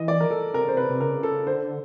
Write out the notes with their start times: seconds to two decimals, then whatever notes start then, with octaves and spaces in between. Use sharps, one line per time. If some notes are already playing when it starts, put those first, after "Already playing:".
Already playing: E3 D#5
0.08 D5
0.20 A#4
0.30 A4
0.54 C3 A#4
0.64 C#3 C5
0.74 C3 B4
0.90 C3
1.00 C#3 A#4
1.23 A4
1.47 D3 C5